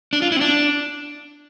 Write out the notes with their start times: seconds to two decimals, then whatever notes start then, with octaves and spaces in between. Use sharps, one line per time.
0.13 D4
0.22 F4
0.32 E4
0.37 C4
0.41 D4